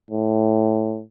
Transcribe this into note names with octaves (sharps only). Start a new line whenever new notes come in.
A2